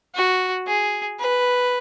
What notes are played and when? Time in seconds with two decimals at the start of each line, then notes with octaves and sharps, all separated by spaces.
0.15 F#4
0.67 G#4
1.19 B4